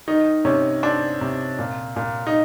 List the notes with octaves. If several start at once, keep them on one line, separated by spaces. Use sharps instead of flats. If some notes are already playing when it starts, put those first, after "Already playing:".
D#3 D#4
C3 C#4
C4 D4
C3
A#2
A#2
D#4